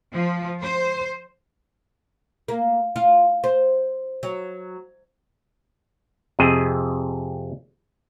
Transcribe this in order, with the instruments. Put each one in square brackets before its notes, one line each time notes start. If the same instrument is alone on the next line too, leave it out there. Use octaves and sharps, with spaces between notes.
[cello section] F3
C5
[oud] A#3
F4
C5
F#3
[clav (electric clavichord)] F2 C3 G#4 D#5